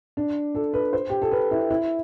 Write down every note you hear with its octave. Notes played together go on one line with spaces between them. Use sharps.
D4
A4
B4
C5
G4
A4
B4
E4
E4